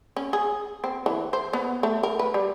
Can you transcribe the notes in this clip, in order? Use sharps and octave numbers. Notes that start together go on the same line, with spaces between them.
C#4
G#4
C4
E3
C5
B3
A3
A#4
B4
G3